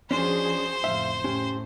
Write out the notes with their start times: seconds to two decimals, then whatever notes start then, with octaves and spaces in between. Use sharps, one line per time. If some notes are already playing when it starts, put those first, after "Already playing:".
0.11 F3 C#4 D4 F#4 G#4 C5
0.84 F2 A2 C#3 E5 F5
1.24 A2 C#4 G4